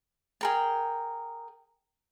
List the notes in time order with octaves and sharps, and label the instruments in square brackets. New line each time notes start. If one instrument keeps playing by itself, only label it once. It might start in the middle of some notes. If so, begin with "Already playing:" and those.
[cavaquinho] G#4 A#4 G5